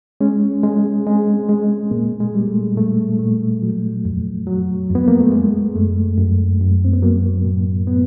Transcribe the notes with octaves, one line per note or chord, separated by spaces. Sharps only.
G#3 C#4
G#3
G#3 C4
G#3
A#2 A#3
G#3
G3
A3
A#2 A3
A#2 A3
F#3
F2
F#3
F2
B3
A#3
A3
G#3
F#2 A3
F#2
F#2
C4
B3
F#3 A#3
A2
A2 B3